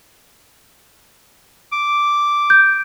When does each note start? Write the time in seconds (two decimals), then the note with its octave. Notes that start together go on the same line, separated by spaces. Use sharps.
1.72 D6
2.50 G6